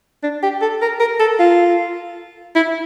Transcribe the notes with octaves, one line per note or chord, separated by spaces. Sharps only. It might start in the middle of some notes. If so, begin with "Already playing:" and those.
D4
G4
A4
A#4
A#4
A4
F4
E4